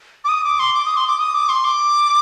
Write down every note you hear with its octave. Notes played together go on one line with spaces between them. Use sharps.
D6
D#6
D6
C6
D6
D#6
C6
D6
D#6
D6
C6
D6